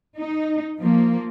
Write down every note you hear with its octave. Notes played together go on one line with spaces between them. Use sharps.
D#4
F3 A#3